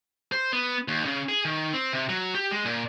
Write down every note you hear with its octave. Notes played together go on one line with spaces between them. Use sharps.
C5
B3
D#2
C#3
G#4
D#3
C4
C3
F#3
G4
G#3
A#2